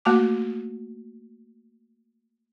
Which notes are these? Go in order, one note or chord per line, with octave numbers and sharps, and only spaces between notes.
A3 A#3 F#4 A5 D6